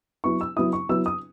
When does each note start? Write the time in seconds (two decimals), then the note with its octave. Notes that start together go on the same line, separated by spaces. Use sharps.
0.24 F#3 B3 E4 C#6
0.41 E6
0.56 F#3 B3 E4 D#6
0.73 C#6
0.89 F#3 B3 E4 E6
1.06 D#6